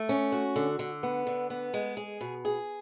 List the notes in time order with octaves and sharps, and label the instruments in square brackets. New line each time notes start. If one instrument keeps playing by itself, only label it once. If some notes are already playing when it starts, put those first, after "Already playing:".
Already playing: [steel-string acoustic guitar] A3
C#4
F#4
D3
D3
B3
D3
B3
G#3
G#4
B2
G#4